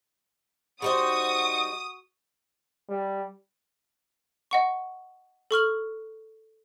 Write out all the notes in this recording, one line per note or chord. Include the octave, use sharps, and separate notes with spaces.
G3 D#4 F#4 C5 C#6 D#6
G3
D#5 F#5 C#6
A4 C#6 F6 F#7